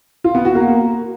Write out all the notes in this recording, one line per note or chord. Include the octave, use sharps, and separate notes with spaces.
F4
B3
F#4
A#3